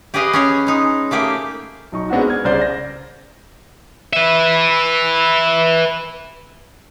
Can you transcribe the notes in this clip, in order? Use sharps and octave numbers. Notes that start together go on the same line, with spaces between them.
G4 G#4 B4 D#5 F5
C#4 G#4 C#5
G#3 D#4
A3 A#3 G4 G#4
B1 D#4 C#6
G#3 B3 C4 D4 D#4 F#4
F6 G#6
C2 C#3 C5 D5 G6
A#6
B4 E5